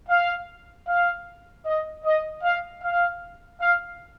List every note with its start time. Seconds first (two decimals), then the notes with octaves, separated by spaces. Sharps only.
0.08 F5
0.87 F5
1.66 D#5
2.04 D#5
2.43 F5
2.83 F5
3.61 F5